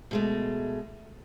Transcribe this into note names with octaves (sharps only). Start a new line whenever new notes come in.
B2 G#3 A3